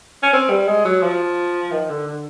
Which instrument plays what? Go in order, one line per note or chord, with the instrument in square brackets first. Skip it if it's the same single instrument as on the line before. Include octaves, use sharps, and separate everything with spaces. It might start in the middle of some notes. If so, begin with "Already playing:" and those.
[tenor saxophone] C#4
C4
G3
G#3
F#3
F3
D#3
D3
D3